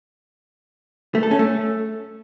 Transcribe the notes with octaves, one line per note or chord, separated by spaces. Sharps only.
A3
A4
C#4
A3